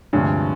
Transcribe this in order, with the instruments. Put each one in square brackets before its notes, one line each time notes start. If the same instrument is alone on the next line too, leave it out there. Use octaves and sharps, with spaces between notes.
[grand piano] D2 C3 F3 G#3 C#4 [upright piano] G2